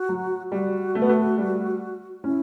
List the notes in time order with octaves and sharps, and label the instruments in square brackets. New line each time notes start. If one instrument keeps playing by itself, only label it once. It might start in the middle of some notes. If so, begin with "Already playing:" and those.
Already playing: [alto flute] F#4
[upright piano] F#3
[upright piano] G3 [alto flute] F#4
[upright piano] A3
B3
A3
G3
[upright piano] C#4 [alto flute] E4